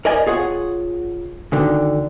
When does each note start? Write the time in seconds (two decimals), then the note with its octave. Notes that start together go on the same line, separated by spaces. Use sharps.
0.05 A#4 D5 D#5 G#5
0.26 F4 G#4 C#5 F#5
1.52 D2 D3 D#3